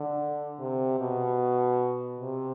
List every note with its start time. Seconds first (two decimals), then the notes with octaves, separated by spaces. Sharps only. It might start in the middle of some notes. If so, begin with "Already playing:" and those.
Already playing: D3
0.59 C3
1.00 B2
2.21 C3